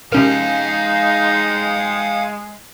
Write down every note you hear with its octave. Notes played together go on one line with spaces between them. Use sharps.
C3 G#3 C#4 D#4 A#4 F5 G5